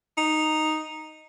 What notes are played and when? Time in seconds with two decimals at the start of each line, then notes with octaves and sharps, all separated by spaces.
0.17 D#4